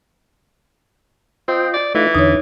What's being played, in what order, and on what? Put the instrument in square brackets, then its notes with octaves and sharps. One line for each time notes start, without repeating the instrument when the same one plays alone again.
[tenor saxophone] C4 [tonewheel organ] F4 D#5 G5
[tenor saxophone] D5
[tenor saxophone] E3 [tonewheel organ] A3 D#4 F4
[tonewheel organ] E2 D3 [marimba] D#4 C#5